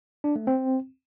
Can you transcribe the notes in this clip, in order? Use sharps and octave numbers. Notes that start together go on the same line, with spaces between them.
D4
A3
C4